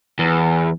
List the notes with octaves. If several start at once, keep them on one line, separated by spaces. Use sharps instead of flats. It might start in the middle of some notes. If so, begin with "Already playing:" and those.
E2